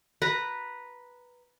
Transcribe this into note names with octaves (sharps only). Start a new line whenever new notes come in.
B4 A#5